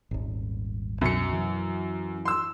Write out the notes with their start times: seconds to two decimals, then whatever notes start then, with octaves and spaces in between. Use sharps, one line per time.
0.11 D#1 G#1
1.01 C2 F#2 B2 C#7
1.33 E3 F#3
2.25 C6 E6